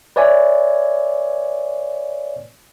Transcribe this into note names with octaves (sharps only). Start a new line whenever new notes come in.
B4 C#5 D5 E5 G#5